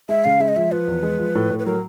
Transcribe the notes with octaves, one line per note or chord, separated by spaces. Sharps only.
G#3 E5
C#3 F5
G#3 E5
D#5
F3 E5
F3 B4
E2
G#3
F3
A2
A2
B4
F#3 A#4